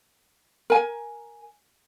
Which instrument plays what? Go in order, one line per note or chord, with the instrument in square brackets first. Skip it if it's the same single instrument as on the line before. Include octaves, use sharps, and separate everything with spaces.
[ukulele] A#4 G#5